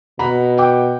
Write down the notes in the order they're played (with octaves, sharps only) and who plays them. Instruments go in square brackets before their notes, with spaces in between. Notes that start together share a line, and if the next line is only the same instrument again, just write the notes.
[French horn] B2 [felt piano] F#5 A#5 B5
[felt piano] F#5 G5 D6